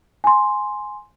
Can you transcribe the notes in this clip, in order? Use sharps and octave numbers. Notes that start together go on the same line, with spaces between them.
G#5 C6